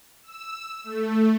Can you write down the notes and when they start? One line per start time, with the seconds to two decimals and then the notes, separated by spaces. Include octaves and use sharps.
0.23 E6
0.84 A3